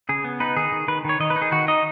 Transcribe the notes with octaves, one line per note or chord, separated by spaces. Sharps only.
C#3 G#4
B3
D#4 B4
D#3 G#4
D#3
D#3 B4
D#3 C#5
D#3 D#5
B4
D#4
G#4
D#3 F#4
D#4 D#5